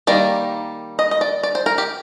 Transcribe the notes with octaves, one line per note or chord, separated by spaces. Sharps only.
D#3 G3 A#3 D5
D#5
D#5
D5
D5
C5
A#4
G4